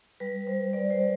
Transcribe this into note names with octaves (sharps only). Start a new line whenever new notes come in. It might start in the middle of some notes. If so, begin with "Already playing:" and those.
G3 B4
G3 C5
G3 D5
C5
G3